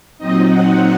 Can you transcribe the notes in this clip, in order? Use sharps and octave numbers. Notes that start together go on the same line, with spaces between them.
A#2 F#3 C4 D#4 D#5
F#5